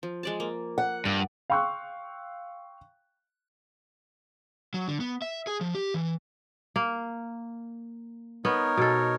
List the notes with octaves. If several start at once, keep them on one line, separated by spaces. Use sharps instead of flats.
F3
G#3 D5 A5
A#3
F#5
G2 D5
F5 G5 C6 C#6 E6 F#6
F#3
D3
B3
E5
G#4
F3
G4
E3
A#3
B3 D#4 A#4 C#5
B2 A4